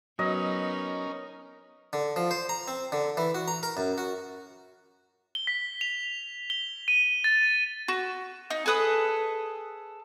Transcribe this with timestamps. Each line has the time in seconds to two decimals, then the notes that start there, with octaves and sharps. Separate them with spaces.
0.19 F#3 B3 C#4 D#4 A#4 D#5
1.93 D3
2.16 F3
2.31 C5
2.49 A#5
2.68 C4
2.92 D3
3.17 E3
3.35 F#4
3.48 A#5
3.63 A#4
3.77 F#2
3.98 F#4
5.35 G7
5.47 B6
5.81 F7
6.50 G7
6.88 D#7
7.24 A6
7.88 F#4
8.50 D#4
8.66 G#4 A4 B4 D#6